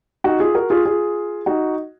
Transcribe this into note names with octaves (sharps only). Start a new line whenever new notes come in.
D#4 F#4
F4 G#4
F#4 A#4
F4 G#4
F4 G#4
D#4 F#4